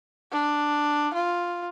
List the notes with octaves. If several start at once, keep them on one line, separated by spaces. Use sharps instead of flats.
D4
F4